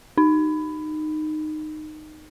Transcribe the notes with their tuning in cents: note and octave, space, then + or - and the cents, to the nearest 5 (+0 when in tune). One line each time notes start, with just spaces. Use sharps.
D#4 -15